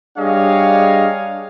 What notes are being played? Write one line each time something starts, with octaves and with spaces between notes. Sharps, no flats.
G3 D4 G#4 C#5 D#5 F5